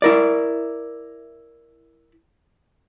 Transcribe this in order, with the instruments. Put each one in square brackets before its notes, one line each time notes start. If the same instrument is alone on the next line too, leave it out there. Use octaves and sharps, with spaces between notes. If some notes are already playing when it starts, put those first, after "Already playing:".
[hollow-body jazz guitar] E4 A#4 D5